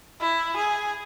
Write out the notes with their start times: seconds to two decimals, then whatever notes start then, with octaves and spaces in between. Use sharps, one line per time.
0.21 E4
0.57 G#4